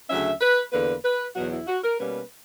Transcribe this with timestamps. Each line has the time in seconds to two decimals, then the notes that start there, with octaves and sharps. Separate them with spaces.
0.10 D2 C#3 F#3 C#4 E5
0.41 B4
0.73 E2 D3 A#3 B4
1.05 B4
1.36 E2 B2 F#3 F#4
1.52 E4
1.68 F#4
1.84 A#4
2.00 B2 G3 A#3 C#4 B4